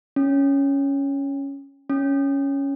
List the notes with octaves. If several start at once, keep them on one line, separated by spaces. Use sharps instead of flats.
C#4
C#4